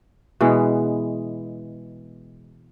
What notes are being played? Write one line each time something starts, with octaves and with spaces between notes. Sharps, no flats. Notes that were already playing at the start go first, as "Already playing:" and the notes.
B2 E3 G#3 B3